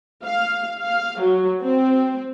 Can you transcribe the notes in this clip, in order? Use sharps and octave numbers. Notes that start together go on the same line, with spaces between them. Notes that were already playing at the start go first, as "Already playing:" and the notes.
F5
F5
F#3
C4